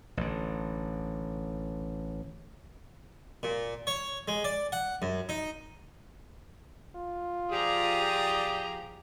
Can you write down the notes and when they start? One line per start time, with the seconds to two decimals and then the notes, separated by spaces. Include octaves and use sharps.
0.17 A1 D3
3.43 A#2
3.87 C#5
4.28 G#3
4.44 D5
4.72 F#5
5.02 F#2
5.29 D#4
6.96 F4
7.51 F3 G4 G#4 D5 A#5 D#6